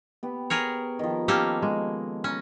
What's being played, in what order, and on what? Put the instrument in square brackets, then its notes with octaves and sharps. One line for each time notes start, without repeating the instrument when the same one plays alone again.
[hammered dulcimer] B3 G4
[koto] G#4 A#4 C#5
[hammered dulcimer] D#3 F3
[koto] A#3 C#4 A4 [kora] G4
[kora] G#3
[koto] C#4 [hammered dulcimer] A#5 B5